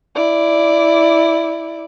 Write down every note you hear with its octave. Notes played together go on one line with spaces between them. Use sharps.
E4 D5